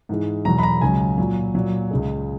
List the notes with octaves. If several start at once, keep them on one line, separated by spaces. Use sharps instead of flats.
G#2 E3 G#3
E2 B2 F#3 A#5
B5
A#5
C#2 C#3 F#3 G#5
A#2 F#3
A#2 F#3
C#2 C#3 G#3